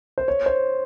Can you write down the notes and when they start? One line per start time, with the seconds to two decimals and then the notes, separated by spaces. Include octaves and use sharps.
0.18 C5
0.28 C#5
0.46 C5